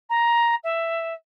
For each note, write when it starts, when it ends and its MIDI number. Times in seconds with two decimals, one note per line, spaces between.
0.09 0.55 82
0.63 1.14 76